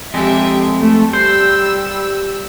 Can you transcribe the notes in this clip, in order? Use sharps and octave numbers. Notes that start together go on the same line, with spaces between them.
F2 G#3 G4 E5
A3
G3 C5 E6